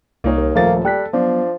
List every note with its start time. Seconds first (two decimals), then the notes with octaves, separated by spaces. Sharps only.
0.24 C2 A#3 D#4 C#5
0.37 D#2
0.55 D#1 F3 A3 A#3 C5 A6
0.85 G3 A4 G5 F#6 B6
1.13 F3 F#3 B3 D4